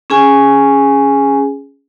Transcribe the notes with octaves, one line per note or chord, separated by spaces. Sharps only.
C#4 G#4 G#5